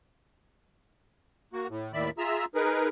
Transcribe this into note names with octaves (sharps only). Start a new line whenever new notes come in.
A#3 F#4
A2
D#2 A2 D#3 D5 E5 B5
F4 G#4 E5 A#5 E6
D#4 G#4 A#4 B4